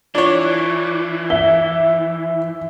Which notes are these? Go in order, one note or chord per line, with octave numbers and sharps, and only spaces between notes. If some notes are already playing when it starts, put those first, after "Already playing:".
E3 D4 F4 C#5
E5 G7